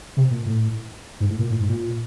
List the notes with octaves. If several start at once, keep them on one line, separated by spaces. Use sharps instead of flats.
C3
A#2
A2
G#2
A2
A#2
A2
G#2
A#2